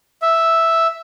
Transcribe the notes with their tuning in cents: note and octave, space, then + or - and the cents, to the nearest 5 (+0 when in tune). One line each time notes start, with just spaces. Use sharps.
E5 +0